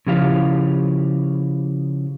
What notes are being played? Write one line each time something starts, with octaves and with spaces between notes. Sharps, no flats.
C#3 F3 E4 G4 F5